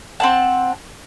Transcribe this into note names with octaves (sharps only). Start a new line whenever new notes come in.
C4 F#5 A5